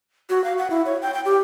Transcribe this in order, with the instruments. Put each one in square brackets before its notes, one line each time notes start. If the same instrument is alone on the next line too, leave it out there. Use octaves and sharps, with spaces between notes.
[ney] F#4
F5
F#5
E4
C#5
G5
G5
G4